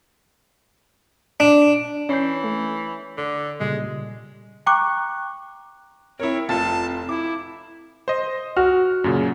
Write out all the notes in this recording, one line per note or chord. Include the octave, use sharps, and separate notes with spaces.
D4
E3 C#4 C#5 G6 C7
A3
D3
A#2 C#3 G3 G#3
G5 A#5 C#6 D6 F#6
C4 E4 A#4 C#5
F1 F4 A5 A6
E4 D6
C5 D#5
F#4 F6
F#2 A#2 C#3